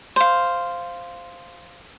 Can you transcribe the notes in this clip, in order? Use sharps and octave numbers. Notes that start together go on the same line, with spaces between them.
C5 F5